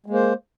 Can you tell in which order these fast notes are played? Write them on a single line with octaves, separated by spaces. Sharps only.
G#3 A#3 C5